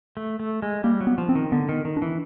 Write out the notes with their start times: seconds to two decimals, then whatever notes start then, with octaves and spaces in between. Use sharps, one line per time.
0.17 A3
0.40 A3
0.62 G#3
0.84 G3 A#3
1.01 F#3
1.07 B3
1.18 F3
1.29 C4
1.35 D#3
1.52 D3 B3
1.69 D#3
1.85 D#3
1.97 D4
2.02 E3